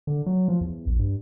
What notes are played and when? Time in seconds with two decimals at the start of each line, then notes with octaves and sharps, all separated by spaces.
0.07 D3
0.26 F#3
0.48 F3
0.61 E2
0.87 A#1
0.99 G2